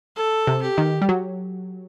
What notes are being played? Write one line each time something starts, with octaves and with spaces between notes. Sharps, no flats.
A4
C3
G4
D#3
G3
F#3